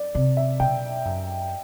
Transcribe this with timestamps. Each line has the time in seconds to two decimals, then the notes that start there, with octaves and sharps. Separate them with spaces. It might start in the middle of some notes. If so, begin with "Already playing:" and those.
Already playing: D5
0.15 C3 D5
0.37 E5
0.60 B2 G5
1.05 F#2